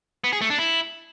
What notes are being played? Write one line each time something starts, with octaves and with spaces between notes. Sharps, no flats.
B3
G#4
A3
D4
E4